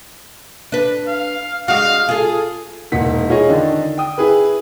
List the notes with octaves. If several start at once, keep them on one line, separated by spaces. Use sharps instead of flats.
D4 B4
F5
G#3 D4 F#4 F5
F4 G#4 A4
E1 A#2 D#4 E4 F#5 B6
E4 F4 G#4 C#5 D#5
D3 D#3 D4 D#4
G5 D#6
E4 G#4 B4